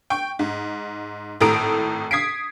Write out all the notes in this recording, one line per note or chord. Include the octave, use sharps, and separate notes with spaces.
G5 C#6
G#2
G#1 A2 A4 A#5 D#6 D7
D#6 G#6 B6 C7 D7